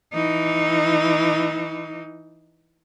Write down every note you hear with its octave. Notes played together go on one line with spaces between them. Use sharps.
E3 D#4